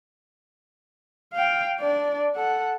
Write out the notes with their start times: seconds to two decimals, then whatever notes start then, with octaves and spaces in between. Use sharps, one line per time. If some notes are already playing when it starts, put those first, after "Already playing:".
1.33 F5 G5
1.80 D4 D5
2.35 A4 F#5